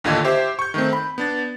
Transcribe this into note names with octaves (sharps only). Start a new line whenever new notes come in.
A1 D#2 D3 F4 D#5 G#6
G4 C5 E5
C#6 G6
D#3 A3 C4
B5
B3 D4 A6